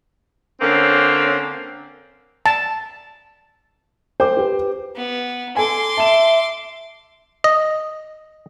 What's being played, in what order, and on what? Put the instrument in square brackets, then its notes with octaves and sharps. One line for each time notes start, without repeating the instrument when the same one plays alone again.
[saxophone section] D3 A#3 C4 C#4
[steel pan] A5
[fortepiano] C5 [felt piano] G5 D6
[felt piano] G4 B4
[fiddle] B3
[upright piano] A4 G#5 [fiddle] C6 D6
[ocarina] E5 [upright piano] A5 E7
[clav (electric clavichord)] D#5